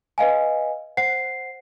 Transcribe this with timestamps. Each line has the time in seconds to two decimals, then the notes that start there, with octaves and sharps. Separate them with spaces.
0.18 B4 D#5 F5 G#5
0.97 C5 F#5 C7